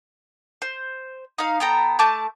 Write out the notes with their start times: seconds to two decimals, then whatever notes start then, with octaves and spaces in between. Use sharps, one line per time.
0.62 C5
1.38 D#4 F5
1.60 B3 A4 G5 A#5
1.99 A3 A5 D6 G6